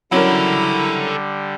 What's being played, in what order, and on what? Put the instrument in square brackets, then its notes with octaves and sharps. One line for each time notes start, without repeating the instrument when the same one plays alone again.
[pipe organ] D3 G3 [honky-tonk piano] F#3 C#4 A#4 [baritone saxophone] E4 [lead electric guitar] A4 F#5